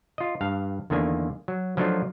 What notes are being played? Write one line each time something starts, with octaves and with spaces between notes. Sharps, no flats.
F4 D#5
G2 F5
E2 D3 D#3 A#3 G#5
F#3
F3 F#3 A3 D4 D#4 F4